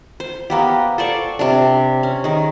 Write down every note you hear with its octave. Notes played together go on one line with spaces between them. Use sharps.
C5
A#3 B3 G4
A4 C5 D5 C#6
C3 D4
C#4
D#3 G#4